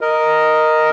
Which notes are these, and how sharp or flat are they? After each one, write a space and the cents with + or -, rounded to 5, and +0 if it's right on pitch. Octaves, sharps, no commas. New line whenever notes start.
A#4 +0 D#5 +0